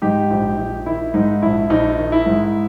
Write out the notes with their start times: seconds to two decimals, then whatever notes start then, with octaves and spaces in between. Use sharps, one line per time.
0.02 G#2 D#4 G4
0.30 A#1
0.58 A#1
0.86 D#3 E4
1.14 G#2 D#4
1.42 A#1 E4
1.70 A#1 D#4
1.98 D#3
2.12 E4
2.26 G#2